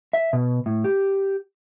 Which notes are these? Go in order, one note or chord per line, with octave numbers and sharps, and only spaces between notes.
E5
B2
A2
G4